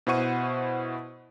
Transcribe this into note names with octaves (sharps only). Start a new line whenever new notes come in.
B2 E4 C5 F#5 C#6 D#7